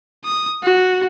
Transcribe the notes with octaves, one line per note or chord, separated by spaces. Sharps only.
D#6
F#4